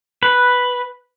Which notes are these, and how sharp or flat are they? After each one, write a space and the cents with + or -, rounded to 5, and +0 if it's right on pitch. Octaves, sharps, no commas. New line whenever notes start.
B4 +0